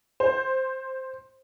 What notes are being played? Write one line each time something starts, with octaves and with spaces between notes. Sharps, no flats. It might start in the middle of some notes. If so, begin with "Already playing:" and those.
C5